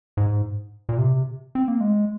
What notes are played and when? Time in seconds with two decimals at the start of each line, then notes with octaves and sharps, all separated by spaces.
0.17 G#2
0.89 A#2
0.98 C3
1.55 C4
1.68 A#3
1.80 G#3